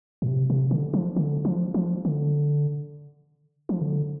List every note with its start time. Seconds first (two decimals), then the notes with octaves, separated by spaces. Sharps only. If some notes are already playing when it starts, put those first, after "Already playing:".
0.22 A2
0.28 C3
0.50 C3
0.71 D3
0.94 F3
1.16 D3
1.45 F3
1.74 F3
2.05 D3
3.69 F3
3.82 D3